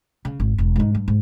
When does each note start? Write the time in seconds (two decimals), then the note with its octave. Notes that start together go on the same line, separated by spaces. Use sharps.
0.25 C#3
0.40 G#1
0.58 E1
0.76 G#2 D#4
0.95 G2
1.08 G#2